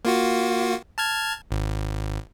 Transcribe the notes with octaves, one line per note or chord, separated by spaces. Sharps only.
A#3 F4 F#4
A5 F6 G#6
G#1